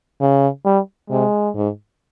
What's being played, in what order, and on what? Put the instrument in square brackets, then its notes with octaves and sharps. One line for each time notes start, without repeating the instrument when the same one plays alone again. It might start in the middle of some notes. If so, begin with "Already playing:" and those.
[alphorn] C#3
[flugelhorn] G3
[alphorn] C3 [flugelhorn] G#3
[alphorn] G#2